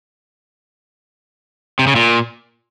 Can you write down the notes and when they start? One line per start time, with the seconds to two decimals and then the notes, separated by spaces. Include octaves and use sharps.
1.79 C3
1.87 C#3
1.96 A#2